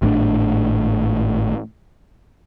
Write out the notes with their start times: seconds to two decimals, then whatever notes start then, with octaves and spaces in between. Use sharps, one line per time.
0.02 G#1 A2 D3 D4